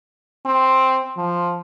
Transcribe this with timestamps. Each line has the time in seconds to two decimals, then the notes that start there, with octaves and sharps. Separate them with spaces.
0.46 C4
1.17 F3